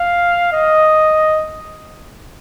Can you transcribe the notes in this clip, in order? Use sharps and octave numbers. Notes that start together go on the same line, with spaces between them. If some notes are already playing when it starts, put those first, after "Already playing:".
Already playing: F5
D#5